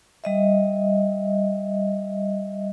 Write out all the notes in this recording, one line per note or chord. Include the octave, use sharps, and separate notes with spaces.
G3 D#5 E5